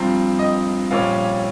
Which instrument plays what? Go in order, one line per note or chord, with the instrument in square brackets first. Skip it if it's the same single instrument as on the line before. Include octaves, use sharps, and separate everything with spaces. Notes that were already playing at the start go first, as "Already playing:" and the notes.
Already playing: [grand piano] G2 F3 C4 A#5
D#5
A#1 A#2 G3 C#4 F5